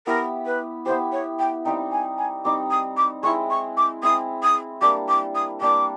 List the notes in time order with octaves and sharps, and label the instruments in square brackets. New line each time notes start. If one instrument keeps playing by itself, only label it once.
[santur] B3 E4 G4 [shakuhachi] A#4
[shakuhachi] B4
[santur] B3 E4 G4 [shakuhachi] C5
[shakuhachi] C#5
G5
[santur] G3 C4 D#4 [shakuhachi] G5
[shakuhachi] G#5
G#5
[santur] G3 C4 D#4 [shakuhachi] D6
[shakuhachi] D#6
D6
[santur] G#3 C4 E4 [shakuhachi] C#6
[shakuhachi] C#6
D6
[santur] G#3 C4 E4 [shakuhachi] D#6
[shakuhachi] D#6
[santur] G3 A#3 D4 [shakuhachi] D6
[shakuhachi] D6
D#6
[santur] G3 A#3 D4 [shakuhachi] D6